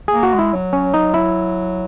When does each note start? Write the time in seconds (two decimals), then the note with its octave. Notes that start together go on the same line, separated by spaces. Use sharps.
0.08 G#4
0.13 A#3
0.23 F#4
0.34 G#3
0.39 E4
0.53 F#3
0.73 C#4
0.94 D#4
1.14 E4